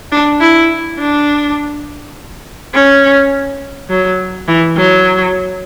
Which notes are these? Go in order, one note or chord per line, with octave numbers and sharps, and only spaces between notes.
D4
E4
D4
C#4
F#3
E3
F#3